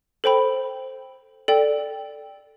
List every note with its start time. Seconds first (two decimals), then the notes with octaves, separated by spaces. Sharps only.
0.24 A4 C5 G5 B5
1.48 A4 D5 G5